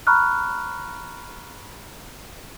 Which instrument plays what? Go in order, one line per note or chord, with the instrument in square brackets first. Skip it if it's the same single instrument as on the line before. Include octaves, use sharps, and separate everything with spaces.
[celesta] A#5 B5 C#6 F6 F#6